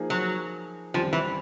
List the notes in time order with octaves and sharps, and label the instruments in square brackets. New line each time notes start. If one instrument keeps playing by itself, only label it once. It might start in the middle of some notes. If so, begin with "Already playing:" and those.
Already playing: [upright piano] F3 A#3 D#4 G#4
[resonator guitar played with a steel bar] F#3
[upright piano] F#2 D#3 G3 C4 [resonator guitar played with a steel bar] F3
[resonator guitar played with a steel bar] E3